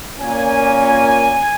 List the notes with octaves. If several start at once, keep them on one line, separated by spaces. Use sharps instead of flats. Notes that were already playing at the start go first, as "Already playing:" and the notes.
A#2 A#3 C#4 G#5